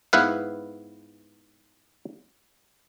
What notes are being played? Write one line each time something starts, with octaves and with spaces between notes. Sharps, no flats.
G#2 B3 E4 B4 F5